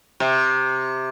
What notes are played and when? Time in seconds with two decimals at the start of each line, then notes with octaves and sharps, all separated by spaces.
0.20 C3